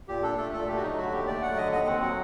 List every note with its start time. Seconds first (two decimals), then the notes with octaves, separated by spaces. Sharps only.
0.08 A#2 G4
0.23 D4 A4
0.38 A3 A4
0.53 A#2 A4
0.68 A3 G4
0.76 F#4
0.82 F#3 D#4
0.97 D3 F#4
1.12 D#2 G4
1.27 A3 D5
1.42 F#3 F#5
1.57 D3 D#5
1.72 D#2 D#5
1.87 C4 F#5
2.02 F#3